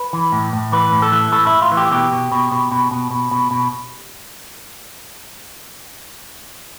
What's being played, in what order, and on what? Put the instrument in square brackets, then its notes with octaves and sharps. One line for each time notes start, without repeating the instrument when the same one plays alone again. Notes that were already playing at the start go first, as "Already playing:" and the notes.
Already playing: [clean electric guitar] B4
E3
A2
A2
E3 B4
A2
A4
E3
A2 A4
A2 E4
F4
E3
G4
B2 G4
B2
B2
B2
B2
B2
B2
B2
B2